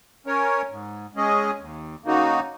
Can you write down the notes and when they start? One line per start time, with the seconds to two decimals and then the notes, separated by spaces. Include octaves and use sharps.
0.26 C#4 A#4 C#5
0.71 G#2
1.15 G#3 C#4 G#4 D#5
1.60 D#2
2.04 C#3 A#3 D#4 F#4